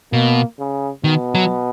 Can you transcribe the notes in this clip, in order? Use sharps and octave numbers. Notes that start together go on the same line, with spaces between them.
B2 A#3
C#3
B2 D#3
F#3